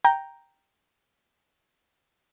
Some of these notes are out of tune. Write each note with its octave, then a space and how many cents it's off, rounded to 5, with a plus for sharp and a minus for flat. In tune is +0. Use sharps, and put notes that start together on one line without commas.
G5 +0 A#5 +0